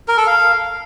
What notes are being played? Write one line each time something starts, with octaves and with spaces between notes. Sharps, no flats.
A#4
A4
F5